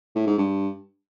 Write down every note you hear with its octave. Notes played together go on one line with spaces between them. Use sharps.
A2
G#2
G2